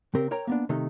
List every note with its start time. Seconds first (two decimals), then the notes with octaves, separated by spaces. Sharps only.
0.15 C#3 C4 G4 A#4
0.31 A#4 C#5 G5 A#5
0.47 A#3 B3 D4
0.69 C3 D#3 A3 D#4